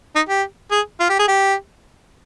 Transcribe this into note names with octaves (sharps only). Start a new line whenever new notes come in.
D#4
G4
G#4
F4
G4
G#4
G4